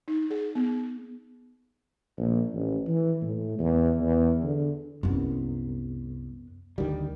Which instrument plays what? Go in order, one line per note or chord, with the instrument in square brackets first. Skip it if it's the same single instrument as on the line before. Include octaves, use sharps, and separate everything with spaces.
[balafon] D#4
G#4
B3
[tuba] A#1
A1
E3
A2
E2
E2
D3
[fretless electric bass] C2 [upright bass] F#2 B3
[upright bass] D2 [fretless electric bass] D3 D#3 G3